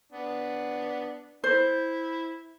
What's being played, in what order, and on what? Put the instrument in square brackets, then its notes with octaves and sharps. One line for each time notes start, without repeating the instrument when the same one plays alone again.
[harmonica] B3 D4
[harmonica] E4 [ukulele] C5